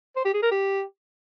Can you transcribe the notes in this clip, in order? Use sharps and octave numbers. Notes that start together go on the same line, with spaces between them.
C5
G4
G#4
A#4
G4